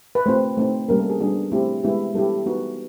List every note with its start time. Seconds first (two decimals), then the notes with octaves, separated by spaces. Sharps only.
0.15 B4
0.26 A3 C4 F4 C5
0.57 A3 C4 D#4
0.88 G3 A#3 C#4 A#4
0.99 A4
1.10 G#4
1.20 G3 B3 D4 F#4 G#4
1.52 A3 C4 E4 G4
1.83 G#3 B3 E4 G4 G#4
2.14 G3 B3 E4 G4 A4
2.46 B3 D#4 F#4